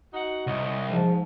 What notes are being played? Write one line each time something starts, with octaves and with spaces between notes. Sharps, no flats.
D#4 F#4 F#5
C2 C#5 D#5
G#2 F3